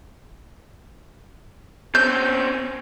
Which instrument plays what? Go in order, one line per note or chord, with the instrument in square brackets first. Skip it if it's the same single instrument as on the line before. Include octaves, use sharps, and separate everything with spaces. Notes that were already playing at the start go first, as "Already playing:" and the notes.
[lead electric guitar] C4 C#4 [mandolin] G6